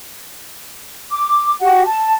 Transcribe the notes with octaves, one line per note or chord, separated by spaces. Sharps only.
D6
F#4 G4 F#5
A5